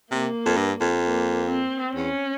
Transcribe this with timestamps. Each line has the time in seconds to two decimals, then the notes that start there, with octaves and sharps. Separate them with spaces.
0.11 C3 A#3
0.46 F2
0.57 G2
0.81 F2
1.03 A#3
1.49 C4
1.95 E2 C#4